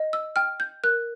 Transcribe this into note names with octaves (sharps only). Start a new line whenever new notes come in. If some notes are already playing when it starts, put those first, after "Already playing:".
Already playing: D#5
E6
G5 F6
G6
A#4 F#6